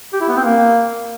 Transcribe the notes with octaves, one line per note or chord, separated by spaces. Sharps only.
G4
E4
B3
C4
A#3